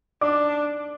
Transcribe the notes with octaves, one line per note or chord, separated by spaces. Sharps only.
D4 D5 D6